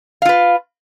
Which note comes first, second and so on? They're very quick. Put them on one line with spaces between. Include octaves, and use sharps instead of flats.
F5 F4 B4